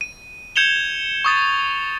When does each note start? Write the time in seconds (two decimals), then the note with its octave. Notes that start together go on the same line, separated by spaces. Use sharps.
0.01 D#7
0.56 G6 G#6 C#7 E7 F7 G7
1.25 C#6 D#6 A6